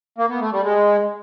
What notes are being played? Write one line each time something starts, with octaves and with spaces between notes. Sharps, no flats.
A#3
B3
A3
G3
G#3